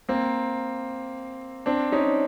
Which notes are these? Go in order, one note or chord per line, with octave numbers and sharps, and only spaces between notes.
A#3 C4
C4 D4
C#4 D#4